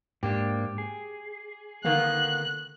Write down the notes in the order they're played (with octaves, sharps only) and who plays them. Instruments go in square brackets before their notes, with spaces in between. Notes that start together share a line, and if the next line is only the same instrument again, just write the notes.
[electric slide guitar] G#2 A#3 D4 [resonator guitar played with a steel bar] G4
[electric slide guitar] G#4
[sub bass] D3 [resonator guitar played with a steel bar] D#3 A#3 B3 [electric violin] F#6